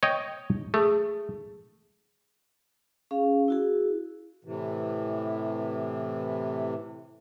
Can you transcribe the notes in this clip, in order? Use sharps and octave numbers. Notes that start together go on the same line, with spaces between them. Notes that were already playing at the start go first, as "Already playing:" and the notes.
C#5 D#5 G5
A3 G#4
C#4 G#4 F5
E4 F#4 G#4
A2 C3 E3